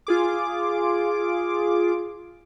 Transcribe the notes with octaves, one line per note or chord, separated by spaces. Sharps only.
F4 G#4 D6